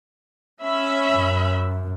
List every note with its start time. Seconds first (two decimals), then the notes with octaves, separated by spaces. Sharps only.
0.62 C#4 E5 B5
1.12 F#2